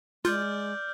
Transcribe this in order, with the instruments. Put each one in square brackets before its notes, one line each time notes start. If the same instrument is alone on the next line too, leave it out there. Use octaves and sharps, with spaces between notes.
[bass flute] G#3 [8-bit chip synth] F4 [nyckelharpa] D5 [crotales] F6 G6